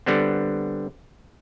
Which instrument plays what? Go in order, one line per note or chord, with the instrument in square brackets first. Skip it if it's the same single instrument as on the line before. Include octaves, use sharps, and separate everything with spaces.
[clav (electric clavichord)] D3 G3 B3 C4